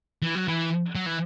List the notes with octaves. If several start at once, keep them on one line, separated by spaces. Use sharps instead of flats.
E3
F#3
E3
F#3
E3